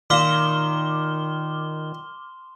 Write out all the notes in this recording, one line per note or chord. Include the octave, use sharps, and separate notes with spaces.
A#2 D#3 C6 D6 F6 E7 G7